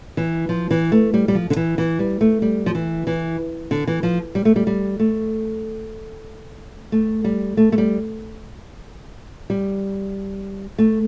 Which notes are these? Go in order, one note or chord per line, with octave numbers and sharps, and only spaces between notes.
E3
F3
E3
A3
G3
G3
F3
D3
E3
E3
G3
A3
G3
F3
E3
E3
D3
E3
F3
G3
A3
G3
G3
A3
A3
G3
A3
A3
G3
G3
A3